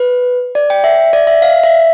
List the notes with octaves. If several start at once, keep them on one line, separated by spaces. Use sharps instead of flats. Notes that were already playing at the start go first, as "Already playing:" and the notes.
Already playing: B4
D5
G5
E5
D5
E5
F5
E5